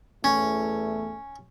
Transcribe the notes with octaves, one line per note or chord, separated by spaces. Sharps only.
E2 A3 C#4